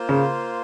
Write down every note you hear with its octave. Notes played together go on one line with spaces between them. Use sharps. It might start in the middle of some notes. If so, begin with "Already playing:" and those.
Already playing: A#3 F4 C5
C#3